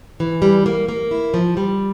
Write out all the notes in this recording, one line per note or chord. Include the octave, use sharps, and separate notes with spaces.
E3
G3
A#3
A#3
E4
F3
G3